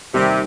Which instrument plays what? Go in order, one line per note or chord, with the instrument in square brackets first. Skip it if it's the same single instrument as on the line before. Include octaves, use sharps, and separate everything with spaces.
[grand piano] D#2 D#3 G3 C4 G4 [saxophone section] C3